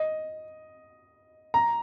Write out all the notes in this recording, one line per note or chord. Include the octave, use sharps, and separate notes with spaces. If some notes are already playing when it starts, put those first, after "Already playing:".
Already playing: D#5
A#5